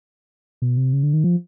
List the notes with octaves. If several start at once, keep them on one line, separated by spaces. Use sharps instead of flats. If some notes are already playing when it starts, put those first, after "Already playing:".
B2
C3
C#3
D3
D#3
F3